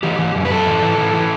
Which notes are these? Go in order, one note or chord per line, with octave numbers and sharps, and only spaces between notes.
E3 G4
E3
F#2
B4
F#2 A4
E3
E3
E3
E3